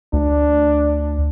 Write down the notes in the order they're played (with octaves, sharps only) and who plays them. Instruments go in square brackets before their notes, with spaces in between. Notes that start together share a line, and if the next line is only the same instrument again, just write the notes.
[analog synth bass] D2 [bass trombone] D4